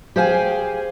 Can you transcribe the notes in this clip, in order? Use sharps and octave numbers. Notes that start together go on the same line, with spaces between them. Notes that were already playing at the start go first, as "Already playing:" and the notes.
G4 G#4 C5 F5 G5 G#5